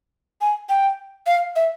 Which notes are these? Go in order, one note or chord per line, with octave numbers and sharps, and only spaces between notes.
G#5
G5
F5
E5